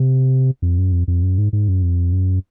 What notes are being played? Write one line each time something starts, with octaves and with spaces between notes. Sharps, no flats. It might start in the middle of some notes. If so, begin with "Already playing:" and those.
Already playing: C3
F2
F#2
F2
F2
F#2
G#2
G#2
F#2
F2
F#2